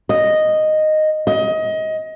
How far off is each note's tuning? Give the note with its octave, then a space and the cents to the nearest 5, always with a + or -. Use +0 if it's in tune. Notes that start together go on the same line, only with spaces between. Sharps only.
D#5 -5
D#5 +20